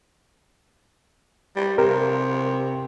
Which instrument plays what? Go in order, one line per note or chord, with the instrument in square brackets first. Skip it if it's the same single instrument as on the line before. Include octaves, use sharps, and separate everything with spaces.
[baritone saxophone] G3
[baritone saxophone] C3 [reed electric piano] A#4